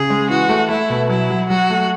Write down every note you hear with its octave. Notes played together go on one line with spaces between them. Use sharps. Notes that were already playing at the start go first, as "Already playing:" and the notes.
Already playing: C#3 G#4
G#3
E3 F#4
A3
A3 E4
B2
F#3 E4
F#3
F#3 F#4
A3